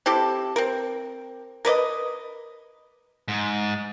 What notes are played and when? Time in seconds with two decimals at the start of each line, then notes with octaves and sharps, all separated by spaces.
0.06 C4 E4 G4 A4
0.56 C4 A#4
1.65 A#4 B4 D5 D#5
3.28 G#2